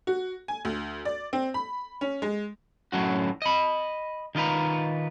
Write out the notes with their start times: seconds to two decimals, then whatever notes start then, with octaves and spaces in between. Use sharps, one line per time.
0.07 F#4
0.48 G#5
0.65 D2
1.05 D5
1.33 C4
1.54 B5
2.01 C#4
2.22 G#3
2.92 A2 F#3 C#4 F#4
3.42 D#5 B5
4.35 D#3 D#4 F4 B4 A#5